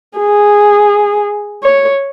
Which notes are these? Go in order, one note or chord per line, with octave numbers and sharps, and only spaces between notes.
G#4
C#5